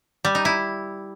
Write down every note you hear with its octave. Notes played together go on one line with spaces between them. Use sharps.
G3
D#4
E4